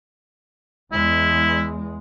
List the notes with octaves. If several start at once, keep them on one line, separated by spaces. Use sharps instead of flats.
E2 G#3 E4